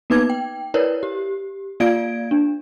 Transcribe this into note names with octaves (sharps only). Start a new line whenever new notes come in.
A#3 B3 D#4 B4 D6 G#6
G5
E4 A#4 B4 C#5 D5
G4
A#3 F4 D5 F5 G#6 D7
D4